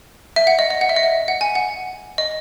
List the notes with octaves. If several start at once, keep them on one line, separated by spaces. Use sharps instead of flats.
E5
F#5
D#5
D#5
F#5
E5
D#5
E5
F#5
G#5
F#5
D#5